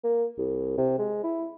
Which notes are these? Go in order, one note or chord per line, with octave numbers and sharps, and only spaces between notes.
A#3
C2
C3
G#3
E4